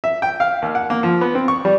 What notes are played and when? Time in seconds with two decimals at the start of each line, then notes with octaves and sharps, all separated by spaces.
0.04 E5
0.22 G5
0.40 F5
0.62 D#2
0.75 F#5
0.90 A#3
1.03 F3
1.21 B3
1.35 C4
1.48 C#6
1.65 G3